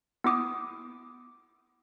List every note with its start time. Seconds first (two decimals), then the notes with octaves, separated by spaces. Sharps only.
0.24 B3 E4 D6 D#6